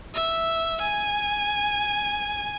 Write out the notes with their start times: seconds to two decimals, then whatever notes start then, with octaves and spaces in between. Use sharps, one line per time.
0.14 E5
0.82 G#5